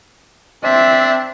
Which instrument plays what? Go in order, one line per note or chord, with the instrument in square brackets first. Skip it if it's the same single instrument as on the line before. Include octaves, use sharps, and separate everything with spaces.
[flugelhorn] C4 [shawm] D4 [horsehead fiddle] E5